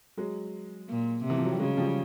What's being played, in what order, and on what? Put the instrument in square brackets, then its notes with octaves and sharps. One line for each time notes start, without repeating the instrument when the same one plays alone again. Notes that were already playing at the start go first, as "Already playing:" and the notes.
[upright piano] F#3 G#3
[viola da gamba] A#2
C3
[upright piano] E3
F3
F#3
G3
[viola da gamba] C#3 [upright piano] F#3 G#3
[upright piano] F3 G3